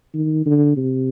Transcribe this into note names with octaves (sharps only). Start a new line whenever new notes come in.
D#3
D3
C3